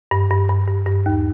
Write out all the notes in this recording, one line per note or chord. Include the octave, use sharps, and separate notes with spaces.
G2
G2
G2
G2
G2
D#2